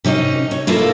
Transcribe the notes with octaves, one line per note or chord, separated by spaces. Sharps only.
C3 C#4 D#4 D#5
C#5
A#3 E4 F4 A4 A#4